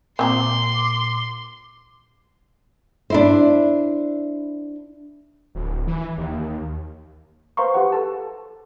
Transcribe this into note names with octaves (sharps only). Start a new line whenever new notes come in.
A#2 C4 G#5 A#5 C6 D6
D4 E4 C5
D1
E3
D#2
B4 C5 F5 A#5 C6 C#6
G4 B4 F#5
A4 A5